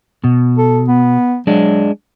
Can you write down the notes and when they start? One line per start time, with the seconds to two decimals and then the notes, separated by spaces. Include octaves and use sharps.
0.24 B2
0.58 A4
0.88 B3
1.47 F#3 G#3 D4